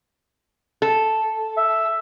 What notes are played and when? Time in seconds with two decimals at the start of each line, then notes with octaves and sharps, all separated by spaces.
0.82 A4
1.57 E5